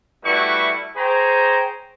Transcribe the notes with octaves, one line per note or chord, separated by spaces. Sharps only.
G3 A3 E4 F#4 B4 C#6
G#4 C5 C#5 G5 A#5